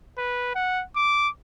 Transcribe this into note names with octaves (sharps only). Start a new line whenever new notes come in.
B4
F#5
D6